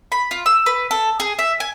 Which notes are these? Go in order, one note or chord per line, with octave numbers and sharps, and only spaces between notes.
B5
F4
E6
B4
A4
G#4
E5
G#5